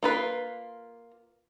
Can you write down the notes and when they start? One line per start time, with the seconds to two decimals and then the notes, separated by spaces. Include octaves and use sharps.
0.03 A#3 F4 B4